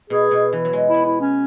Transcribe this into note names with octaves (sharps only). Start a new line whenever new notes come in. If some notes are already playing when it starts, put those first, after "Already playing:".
B2 G#4
B2
E3
F#3
G#3
B3 E4
E4
C#4